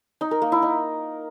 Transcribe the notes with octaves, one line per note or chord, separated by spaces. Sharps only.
D#4
A#4
A#3
E4
D#4